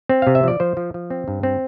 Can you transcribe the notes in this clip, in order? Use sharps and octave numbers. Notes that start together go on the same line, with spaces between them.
C4
C3 F5
E5
F3 D5
F3 C5
F3
F3
C4
G2
C4